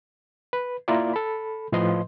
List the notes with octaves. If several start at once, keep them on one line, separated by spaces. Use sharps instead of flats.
B4
A#3 E4 F4 A#4 D5
A4 B5
A2 F3 B4 D#5 C6